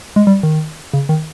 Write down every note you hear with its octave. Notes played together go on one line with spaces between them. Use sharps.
G#3
G3
D#3
C#3
D#3